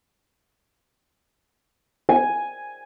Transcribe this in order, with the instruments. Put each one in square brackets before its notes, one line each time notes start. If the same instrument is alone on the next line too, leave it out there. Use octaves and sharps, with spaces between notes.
[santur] G#5